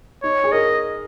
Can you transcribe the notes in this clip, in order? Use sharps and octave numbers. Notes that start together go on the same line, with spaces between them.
D#4 C#5
G#4
A#4 D#5